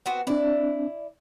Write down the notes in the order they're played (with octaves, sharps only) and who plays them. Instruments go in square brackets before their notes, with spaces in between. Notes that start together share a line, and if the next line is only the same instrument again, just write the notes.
[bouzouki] B3 C4 F#4
[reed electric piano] C4 D4 [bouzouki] E4 D5